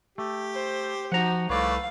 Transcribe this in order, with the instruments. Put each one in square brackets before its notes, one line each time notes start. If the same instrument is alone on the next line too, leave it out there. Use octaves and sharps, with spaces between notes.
[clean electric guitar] A3 [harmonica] G4
[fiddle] C5
[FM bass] F3 [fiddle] D#4 F#4 [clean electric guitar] F#5 A#5
[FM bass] C2 [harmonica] A3 B4 [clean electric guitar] C#5 D5 [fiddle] F5